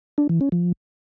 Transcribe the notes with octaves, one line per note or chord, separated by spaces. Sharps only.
D4
E3
C#4
F3